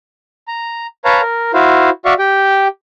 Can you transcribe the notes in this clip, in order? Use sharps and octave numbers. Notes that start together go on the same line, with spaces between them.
A#5
B4 C#5 F5 A5 A#5
A#4
E4 F#4 C5 F5
F#4 D5 E5 F5 C#6
G4 G5